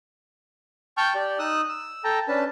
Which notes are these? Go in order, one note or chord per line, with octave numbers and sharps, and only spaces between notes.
G5 A5 C#6 F6 G6
G4 D5
D#4 D#6 E6 F#6
E6
A4 G5 A5 A#5
C#4 D4 B4 A5